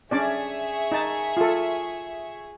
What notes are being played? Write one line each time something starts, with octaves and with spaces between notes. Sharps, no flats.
C#4 D4 G#4 D5 E5 C#6
D#4 A5
F4 A4